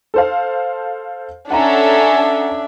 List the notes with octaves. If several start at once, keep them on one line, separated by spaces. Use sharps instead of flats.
A4 C5 F5
C#4 D4 A4 E5 F#5 G#5 A#5